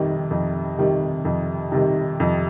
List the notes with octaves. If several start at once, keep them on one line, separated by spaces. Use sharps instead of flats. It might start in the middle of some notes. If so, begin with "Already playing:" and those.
Already playing: F2 C3 D#3 G3
F2
C3 D#3 G3
F2
C3 D#3 G3
F2